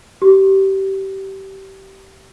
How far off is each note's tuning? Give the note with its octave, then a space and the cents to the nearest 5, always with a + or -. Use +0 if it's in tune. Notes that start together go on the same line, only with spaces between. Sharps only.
G4 -25